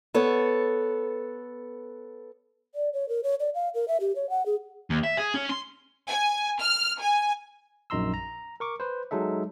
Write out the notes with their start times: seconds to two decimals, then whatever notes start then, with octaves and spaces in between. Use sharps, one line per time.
0.14 B3 A4 C#5
2.74 D5
2.93 C#5
3.09 A#4
3.24 C#5
3.40 D5
3.55 F5
3.74 A#4
3.88 E5
4.00 G4
4.16 C#5
4.30 F#5
4.46 G#4
4.90 D#2
5.04 E5
5.17 G#4
5.34 C#4
5.49 C6
6.08 G#5
6.61 F6
7.01 G#5
7.90 A#1 F#2 D#4 A#5 C6 E6
8.14 A#5
8.60 A#4 C#6 D6
8.80 B4 C5
9.11 F#3 G#3 D#4 A4 E5